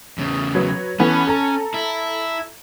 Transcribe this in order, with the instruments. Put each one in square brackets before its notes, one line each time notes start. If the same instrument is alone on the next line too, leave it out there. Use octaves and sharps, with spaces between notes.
[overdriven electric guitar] E2 C#3
[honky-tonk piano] F#3 B4 C#5
[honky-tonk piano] E3 B3 A4 [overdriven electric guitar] C#4
[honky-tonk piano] A4 A#5
[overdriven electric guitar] E4